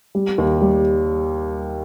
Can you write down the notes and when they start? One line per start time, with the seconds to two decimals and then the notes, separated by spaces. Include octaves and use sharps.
0.15 G3
0.38 D#2
0.62 G3